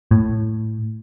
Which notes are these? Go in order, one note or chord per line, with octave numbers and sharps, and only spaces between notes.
A2